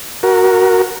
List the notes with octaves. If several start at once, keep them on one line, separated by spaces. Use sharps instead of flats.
F#4 A#4